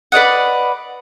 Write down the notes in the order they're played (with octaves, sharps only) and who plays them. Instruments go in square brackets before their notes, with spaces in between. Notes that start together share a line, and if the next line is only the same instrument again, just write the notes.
[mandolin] B4 D5 D#5 F#5